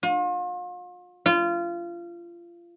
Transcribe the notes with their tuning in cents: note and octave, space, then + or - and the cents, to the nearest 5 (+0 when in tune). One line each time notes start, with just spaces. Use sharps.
F4 +40
F4 -25